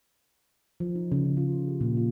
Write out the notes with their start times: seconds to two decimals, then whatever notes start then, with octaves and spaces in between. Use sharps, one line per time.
0.80 F3
0.95 D#4
1.12 C#3
1.25 C#4
1.37 F4
1.52 C#4
1.68 G4
1.81 A#2
1.97 F4